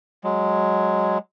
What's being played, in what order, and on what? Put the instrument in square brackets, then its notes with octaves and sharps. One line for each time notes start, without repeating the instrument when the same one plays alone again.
[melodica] F#3 G#3